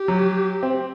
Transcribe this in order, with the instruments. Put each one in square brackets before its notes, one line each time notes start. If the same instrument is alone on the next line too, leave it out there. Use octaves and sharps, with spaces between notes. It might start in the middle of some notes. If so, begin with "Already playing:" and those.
Already playing: [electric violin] G4
[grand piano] F#3
C4